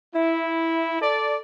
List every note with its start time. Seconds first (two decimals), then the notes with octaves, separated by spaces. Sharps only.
0.14 E4
1.02 A4 D5